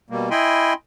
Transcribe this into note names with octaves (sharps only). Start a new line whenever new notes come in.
B2 G3 A#3
E4 D#5 G5 G#5 B5 C6